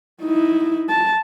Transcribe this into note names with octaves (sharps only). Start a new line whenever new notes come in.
D#4 E4
A5